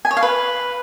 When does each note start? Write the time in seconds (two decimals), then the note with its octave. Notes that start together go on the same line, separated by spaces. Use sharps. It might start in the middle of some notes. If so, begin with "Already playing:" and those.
0.05 G#5
0.11 C#5
0.17 F5
0.23 B4